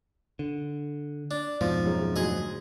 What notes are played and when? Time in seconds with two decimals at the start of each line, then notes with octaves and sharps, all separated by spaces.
0.39 D3
1.31 D4
1.61 F2 G#2 B2 F3
1.85 F#2 G#3 C#5
2.16 D2 F#3 G#4 D#5